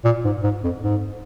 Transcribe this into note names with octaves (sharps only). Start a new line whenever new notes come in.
A#2
G#2
G#2
F2
G#2